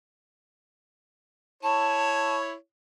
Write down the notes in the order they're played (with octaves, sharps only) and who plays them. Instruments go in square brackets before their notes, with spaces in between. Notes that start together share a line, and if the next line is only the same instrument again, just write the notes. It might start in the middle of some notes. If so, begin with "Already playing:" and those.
[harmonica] E4 C#5 [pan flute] A5